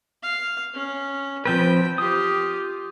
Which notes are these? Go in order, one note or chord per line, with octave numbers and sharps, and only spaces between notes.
F5
C#4
F3 C4 B4 G5
F4 G4 D#6